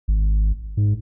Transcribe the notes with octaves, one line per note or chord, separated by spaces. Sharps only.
G#1
G#2